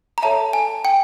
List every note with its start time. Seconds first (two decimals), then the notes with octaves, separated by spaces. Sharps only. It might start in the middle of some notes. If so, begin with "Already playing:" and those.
0.18 A#5
0.23 A4 C#5 E5 A5
0.53 G#5
0.85 G5